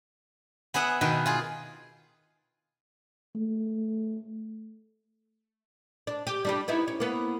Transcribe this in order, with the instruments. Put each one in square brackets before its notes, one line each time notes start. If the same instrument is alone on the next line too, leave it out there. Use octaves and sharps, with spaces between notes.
[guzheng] B3 G#4 E5 F#5
B2 D#3 B4
F4 G#4
[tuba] A3
[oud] D4
G4
G3 D4 G4
B3 D#4 E4
C#4
A#3 B3